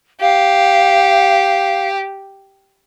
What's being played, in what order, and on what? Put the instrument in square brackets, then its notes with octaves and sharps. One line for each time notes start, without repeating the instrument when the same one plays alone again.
[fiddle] G4 [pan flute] F5